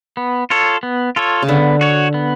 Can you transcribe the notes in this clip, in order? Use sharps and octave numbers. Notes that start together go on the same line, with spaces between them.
B3
F4 A4 C#5
B3
F4 A4 C#5
C#3
D3 B3
F#4 C#5
B3